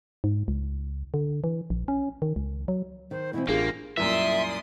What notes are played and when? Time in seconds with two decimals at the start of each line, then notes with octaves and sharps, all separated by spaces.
0.24 G#2
0.48 C#2
1.14 D3
1.44 E3
1.70 A#1
1.88 C#4
2.22 D#3
2.36 C#2
2.68 F#3
3.11 D#3 C5
3.33 B2 E3 C4 E4
3.48 A1 A#3 D4 F4 G4 G#4
3.97 C2 F#2 A#2 D5 E5 C6 D#6